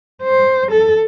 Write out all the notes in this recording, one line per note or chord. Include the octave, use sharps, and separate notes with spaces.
C5
A4